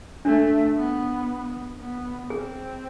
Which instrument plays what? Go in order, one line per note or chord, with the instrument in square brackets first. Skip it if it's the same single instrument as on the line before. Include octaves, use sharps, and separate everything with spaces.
[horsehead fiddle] A3 [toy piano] D4
[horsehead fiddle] B3
B3
[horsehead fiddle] C4 [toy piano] G#4